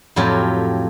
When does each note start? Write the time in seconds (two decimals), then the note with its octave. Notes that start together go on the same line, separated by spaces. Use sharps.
0.16 F2 A2 F#3 F4 G4